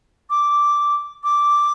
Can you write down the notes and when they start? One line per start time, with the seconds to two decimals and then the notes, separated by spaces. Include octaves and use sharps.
0.30 D6
1.24 D6